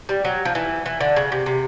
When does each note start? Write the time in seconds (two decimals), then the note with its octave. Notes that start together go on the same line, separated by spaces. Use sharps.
0.09 G3
0.25 F#3
0.45 F3
0.55 E3
0.86 E3
1.00 D3
1.16 C#3
1.32 C3
1.46 C3